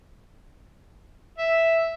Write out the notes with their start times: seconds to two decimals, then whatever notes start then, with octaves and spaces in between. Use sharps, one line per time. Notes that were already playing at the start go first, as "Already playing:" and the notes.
1.38 E5